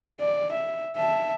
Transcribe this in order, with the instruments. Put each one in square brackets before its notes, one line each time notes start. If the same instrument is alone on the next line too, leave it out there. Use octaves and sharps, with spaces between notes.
[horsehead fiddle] D5
E5
E5 A5